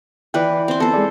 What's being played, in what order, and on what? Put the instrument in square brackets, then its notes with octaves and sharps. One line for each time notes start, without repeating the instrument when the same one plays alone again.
[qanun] E3 B4 [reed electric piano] D5 G5
[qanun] C4 C6
[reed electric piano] B3 [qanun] A4 C5
[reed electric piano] G#3 G#4 D5